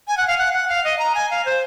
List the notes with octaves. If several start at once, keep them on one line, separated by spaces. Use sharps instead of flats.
G#5
F#5
F5
F#5
F#5
F5
D#5
A#5
G#5
F5
C5